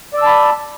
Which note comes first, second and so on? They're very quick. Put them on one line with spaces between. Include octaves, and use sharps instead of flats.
D5 E6 A5 B5